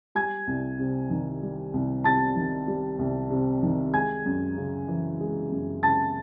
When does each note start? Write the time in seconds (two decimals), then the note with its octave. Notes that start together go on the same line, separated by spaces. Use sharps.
0.15 G3 G#5 G#6
0.47 C2
0.79 C3
1.10 D#3
1.42 G3
1.74 C2
2.04 C3 A5 A6
2.36 D#3
2.67 G3
2.99 C2
3.30 C3
3.63 D#3
3.93 G#3 G#5 G#6
4.25 F#2
4.56 C#3
4.88 E3
5.20 G#3
5.52 F#2
5.83 C#3 A5 A6